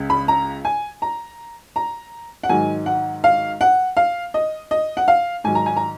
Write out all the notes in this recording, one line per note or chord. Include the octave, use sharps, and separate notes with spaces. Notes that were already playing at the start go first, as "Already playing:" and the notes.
Already playing: C#2 C#3
B5
A#5
G#5
A#5
A#5
F#5
G#2 D#3 F#3 G#5
F#5
F5
F#5
F5
D#5
D#5
F#5
F5
G#2 D#3 F#3 G#5
A#5
G#5
A#5